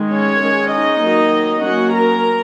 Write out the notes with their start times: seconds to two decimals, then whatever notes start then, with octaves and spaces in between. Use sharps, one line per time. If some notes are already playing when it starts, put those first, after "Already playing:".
Already playing: D#3 G#3
0.12 C#4 C#5
0.43 D#3 G#3 C#4
0.73 D#4 D#5
1.03 D#3 F#3 A#3
1.63 F#3 A#3 C#4 F#4 F#5
1.93 A#4 A#5